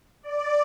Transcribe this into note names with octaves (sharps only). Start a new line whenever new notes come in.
D5